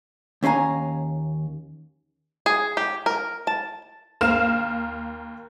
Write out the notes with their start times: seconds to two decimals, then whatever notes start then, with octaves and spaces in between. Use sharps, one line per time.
0.43 D#2 C#4 F5 G#5 A#5
2.46 G#4
2.77 G4
3.06 A#4
3.47 A5
4.21 D#2 A#4 F5 F6 E7